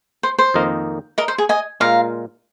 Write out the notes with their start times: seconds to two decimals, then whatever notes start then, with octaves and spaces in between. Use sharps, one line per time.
0.23 C5
0.39 C5
0.54 F2 D#3 A#3 D#4 A#4
1.18 A#4 D#5
1.28 C5
1.38 G#4
1.49 D#5 G#5
1.80 A#2 G#3 F4 A#4 F5 A#5